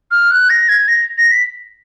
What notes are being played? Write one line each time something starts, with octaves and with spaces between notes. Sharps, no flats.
F6
F#6
A#6
G#6
A#6
A#6
B6